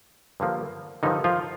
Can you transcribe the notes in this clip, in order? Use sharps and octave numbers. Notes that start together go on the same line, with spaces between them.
G2 D3 F3 A#3
G2 D3 D#3 F3 D#4
F3 F4